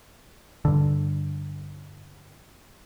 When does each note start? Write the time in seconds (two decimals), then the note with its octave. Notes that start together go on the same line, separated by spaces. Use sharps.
0.65 G2 D3